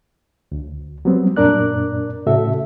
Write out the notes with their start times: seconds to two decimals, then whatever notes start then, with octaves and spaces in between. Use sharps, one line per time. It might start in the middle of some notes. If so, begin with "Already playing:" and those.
0.52 D2
1.05 F#3 G3 B3 C4
1.36 F#2 A#2 D4 A#4 D5 F#6
2.26 A2 C#3 F#4 A4 E5